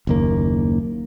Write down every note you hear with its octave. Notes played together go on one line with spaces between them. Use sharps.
F#1 D#2 A#3